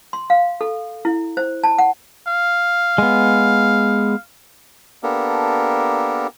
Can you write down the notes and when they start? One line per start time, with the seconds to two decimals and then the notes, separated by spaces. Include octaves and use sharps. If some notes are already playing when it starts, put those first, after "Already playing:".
0.13 C6
0.30 F5
0.61 A4
1.05 E4
1.37 C5
1.63 A5
1.78 F#5
2.28 F5
2.98 G#3 B3
5.03 A#3 B3 D4 G4 A4 A#4